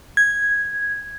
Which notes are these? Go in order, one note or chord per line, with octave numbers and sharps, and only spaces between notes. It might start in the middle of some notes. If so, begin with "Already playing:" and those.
G#6